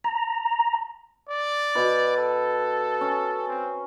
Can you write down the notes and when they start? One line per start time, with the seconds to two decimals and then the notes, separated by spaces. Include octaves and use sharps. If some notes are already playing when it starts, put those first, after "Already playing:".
0.04 A#5
1.29 D5
1.75 B2 B4
2.17 A4
3.01 C#4
3.48 C4